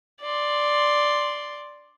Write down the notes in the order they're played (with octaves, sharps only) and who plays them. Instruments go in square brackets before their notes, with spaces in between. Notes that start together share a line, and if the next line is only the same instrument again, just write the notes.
[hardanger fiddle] D5 C6